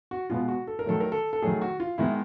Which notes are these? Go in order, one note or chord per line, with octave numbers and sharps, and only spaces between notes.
F#4
B2 G#3 B3 F4
F#4
A4
A#4
D#3 F#3 A3 A4
A#4
A4
A4
D#3 F#3 A3 G#4
F#4
F4
D#3 G#3 B3 E4